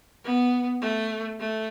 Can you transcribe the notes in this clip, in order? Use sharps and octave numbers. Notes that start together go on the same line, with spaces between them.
B3
A3
A3